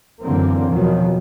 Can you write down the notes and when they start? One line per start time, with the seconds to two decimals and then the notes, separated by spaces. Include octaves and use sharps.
0.22 F#2 A#2 D3 E3 A#3 C4
0.69 E2 B2 D#3 F3 F#3